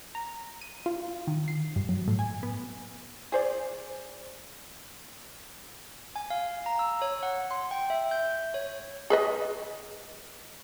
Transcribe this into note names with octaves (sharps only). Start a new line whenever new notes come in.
A#5
D#7
F4
D#3
C7
G2
F#3
A2
G#5
B3
G#4 C5 D5
G#5
F5
A#5
E6
C#5
F#5
C6
G5
E5
G6
C#5
G#4 B4 D#5